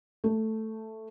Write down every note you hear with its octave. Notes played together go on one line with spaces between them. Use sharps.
A3